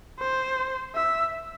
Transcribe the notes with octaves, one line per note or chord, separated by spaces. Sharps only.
C5
E5